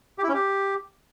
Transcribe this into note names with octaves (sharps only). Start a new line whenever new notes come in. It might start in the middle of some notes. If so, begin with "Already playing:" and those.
G4
E4
C#4
G4